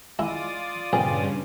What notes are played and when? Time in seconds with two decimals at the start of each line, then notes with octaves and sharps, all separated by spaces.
0.19 G#3 E4 F4 D5 D#6
0.93 A#1 G2 C#3 C4 G#4